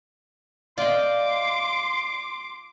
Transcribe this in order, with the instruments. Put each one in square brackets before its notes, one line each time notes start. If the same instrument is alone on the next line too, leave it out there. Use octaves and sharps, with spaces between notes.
[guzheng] F4 G5 [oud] D5 D#5 [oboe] C6 [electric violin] D6